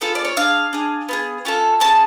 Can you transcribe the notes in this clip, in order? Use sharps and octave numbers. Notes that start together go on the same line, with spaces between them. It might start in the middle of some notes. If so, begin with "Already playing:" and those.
B3 F4 G#4 A4
D5
C#5
D4 F4 G#4 F5
D4 G#4
B3 F4 G#4
C#4 F4 A4
C#4 G#4 A5